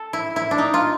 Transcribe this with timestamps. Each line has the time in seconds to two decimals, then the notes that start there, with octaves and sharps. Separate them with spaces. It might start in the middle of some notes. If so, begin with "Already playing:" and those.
Already playing: A4
0.13 E4
0.36 E4
0.51 D4
0.58 D#4
0.74 F4